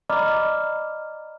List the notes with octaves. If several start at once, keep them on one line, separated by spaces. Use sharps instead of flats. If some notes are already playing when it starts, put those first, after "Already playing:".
D5 D#5 A#5 B5 D6 F6